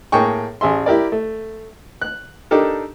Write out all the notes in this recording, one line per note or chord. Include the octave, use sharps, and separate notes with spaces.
A2 A#3 G#4 G5 C#6
A1 G#4 E5 C6
E4 G4 A#4 D5
A3
F#6
D4 D#4 G4 A4 A#4